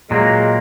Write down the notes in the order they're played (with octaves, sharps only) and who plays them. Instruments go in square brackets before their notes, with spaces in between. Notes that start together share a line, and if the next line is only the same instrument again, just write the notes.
[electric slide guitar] A#2 F#3 A#3 [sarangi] G#3